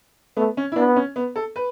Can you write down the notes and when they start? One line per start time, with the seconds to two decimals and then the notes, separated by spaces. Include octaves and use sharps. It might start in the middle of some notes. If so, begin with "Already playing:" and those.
0.37 A3 B3
0.57 C#4
0.72 E4
0.76 B3 D4
0.96 C#4
1.16 B3
1.36 A4
1.56 B4